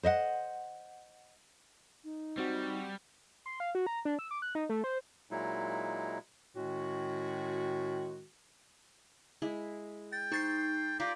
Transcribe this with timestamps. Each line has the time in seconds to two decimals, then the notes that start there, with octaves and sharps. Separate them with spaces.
0.03 C5 D#5 E5 F#5
2.04 D#4
2.38 G3 C4 F#4
3.46 C6
3.60 F5
3.75 F#4
3.87 A#5
4.05 D4
4.19 E6
4.31 D6
4.42 F#6
4.55 D#4
4.69 A3
4.84 C5
5.31 A#2 F#3 G#3 D#4 E4
6.56 A2 D#3 G#3 C#4 F#4
9.42 G#3 E4
10.13 G5 A6
10.32 D#4 C5 C#6 A6 C7
11.00 F4 G4 A#4 D5